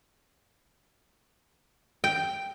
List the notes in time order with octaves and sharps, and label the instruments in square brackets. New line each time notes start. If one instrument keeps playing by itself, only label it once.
[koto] G5